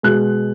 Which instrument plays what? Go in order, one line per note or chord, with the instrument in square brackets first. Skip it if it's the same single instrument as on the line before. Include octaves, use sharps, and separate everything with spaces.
[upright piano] B2 G#3 F#6